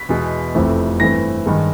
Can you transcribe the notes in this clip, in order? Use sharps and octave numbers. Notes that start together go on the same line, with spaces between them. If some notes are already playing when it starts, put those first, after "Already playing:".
Already playing: B6
E2 B2 G#3
F1 F2 C3 E3 A3
G2 E3 A3 C4 A#6
G2 D#3 G#3